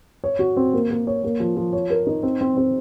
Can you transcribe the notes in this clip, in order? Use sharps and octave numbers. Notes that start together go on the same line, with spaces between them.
C#5
F#4
C4
A#3
A#3
C#5
A#3
F3
F3
C#5
A#4
D#4
C4
C4
C4